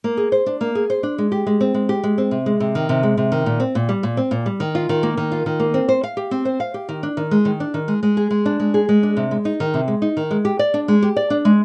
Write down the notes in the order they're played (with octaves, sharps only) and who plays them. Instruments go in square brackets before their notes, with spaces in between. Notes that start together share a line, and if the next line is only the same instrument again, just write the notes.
[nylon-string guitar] A#3
G#4
C5
D4
A#3
G#4
C5
D4
G#3
G4
G#3
C4
G#3
G4
G#3
C4
C3
G#3
C3
D#3
C3
G#3
C3
D#3
A#2
C4
A#2
G3
A#2
C4
A#2
G3
D#3
F4
D#3
A#3
D#3
F4
D#3
A#3
C4
C5
F5
G4
C4
C5
F5
G4
D#3
D4
D#3
G#3
D#3
D4
D#3
G#3
G#3
G#4
G#3
D4
G#3
G#4
G#3
D4
C3
G#3
D#4
D#3
C3
G#3
D#4
D#3
G#3
G4
D5
D4
G#3
G4
D5
D4
G#3